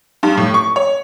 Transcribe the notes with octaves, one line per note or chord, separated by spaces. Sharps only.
G2
A2
C#6
C#5